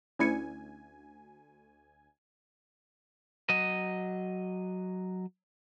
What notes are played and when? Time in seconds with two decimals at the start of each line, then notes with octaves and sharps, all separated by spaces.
0.19 D2 C#4 E4 G#5 C#7
3.49 F#3 D#5